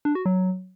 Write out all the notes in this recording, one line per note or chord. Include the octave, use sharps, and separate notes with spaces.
D4
F#4
F#3